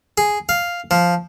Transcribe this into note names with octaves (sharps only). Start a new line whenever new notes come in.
G#4
F5
F3